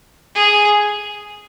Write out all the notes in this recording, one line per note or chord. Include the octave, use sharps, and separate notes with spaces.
G#4